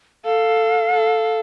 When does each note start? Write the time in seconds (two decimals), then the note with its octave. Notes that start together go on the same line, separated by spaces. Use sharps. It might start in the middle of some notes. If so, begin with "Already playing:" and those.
0.25 A4 F5
0.93 A4